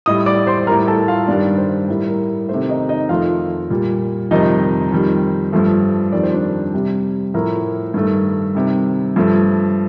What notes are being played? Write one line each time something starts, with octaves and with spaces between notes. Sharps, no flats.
A2 G3 D#5 D#6
D5 D6
C5 C6
A2 G3 A#4 A#5
A4 A5
F4 F5
G2 D#3 G3 D4 D5
C5
A2 G3 A#4
A#4
C3 D#3 A3 C5
D#4 D#5
D#4 D#5
F2 D#3 A3 F4 F5
A#2 G3
F2 C3 D#3 G3 D#4 D#5
F2 D#3 G3
G2 F3 A3
F2 D#3 G3 D5
C5
D4 D5
C3 G3
A2 F3 A3 A#4
G2 D#3 A3
C3 D#3 G3
G2 F3 A3